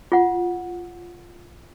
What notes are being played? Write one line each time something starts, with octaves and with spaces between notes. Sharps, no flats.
F4 F#5